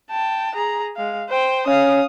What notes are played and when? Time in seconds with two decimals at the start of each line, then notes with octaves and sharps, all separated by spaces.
0.10 G5 A5
0.55 G#4 A#5
0.96 G#3 F5
1.30 C5 G5
1.67 C#4 F5 D#6